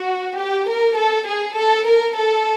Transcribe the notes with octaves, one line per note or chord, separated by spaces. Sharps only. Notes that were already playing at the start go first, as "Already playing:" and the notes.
Already playing: F#4
G4
A#4
A4
G#4
A4
A#4
A4